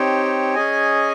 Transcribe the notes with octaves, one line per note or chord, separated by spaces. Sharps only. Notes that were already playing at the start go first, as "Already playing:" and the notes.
Already playing: C4 D#4 G4 C#5
C#4 G#4 D#5 G#5